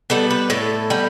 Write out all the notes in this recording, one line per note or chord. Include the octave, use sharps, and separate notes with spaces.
G3 B3 A4
B4
A2 A4
G3 B3